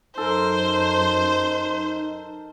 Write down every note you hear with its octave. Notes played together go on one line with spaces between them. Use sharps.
F#2 D#4 A4 A#4 C5 C6